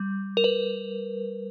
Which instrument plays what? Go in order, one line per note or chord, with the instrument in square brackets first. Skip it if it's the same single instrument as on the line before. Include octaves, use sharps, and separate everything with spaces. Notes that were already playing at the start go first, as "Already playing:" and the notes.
Already playing: [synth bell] G3
A#4
B4